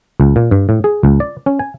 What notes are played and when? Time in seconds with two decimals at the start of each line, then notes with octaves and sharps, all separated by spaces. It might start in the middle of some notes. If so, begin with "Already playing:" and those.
0.20 C#2
0.36 A#2
0.51 G2
0.69 A2
0.84 G#4
1.03 C#2
1.20 D5
1.46 C#4
1.59 G#5